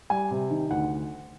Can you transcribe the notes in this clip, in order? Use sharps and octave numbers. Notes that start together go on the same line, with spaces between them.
G3 G#5
C3
D#3
D2 F#5